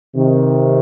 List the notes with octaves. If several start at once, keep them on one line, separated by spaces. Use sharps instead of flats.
C3 D#3